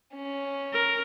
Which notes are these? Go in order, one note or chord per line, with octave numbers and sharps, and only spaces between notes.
C#4
A#4